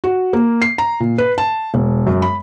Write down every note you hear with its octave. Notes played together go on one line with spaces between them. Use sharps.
F#4
A#3
C7
A#5
A#2
B4
A5
E1
F#2
B5